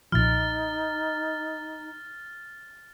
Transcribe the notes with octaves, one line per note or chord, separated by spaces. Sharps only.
B1 A#2 F3 D#4 F6 A6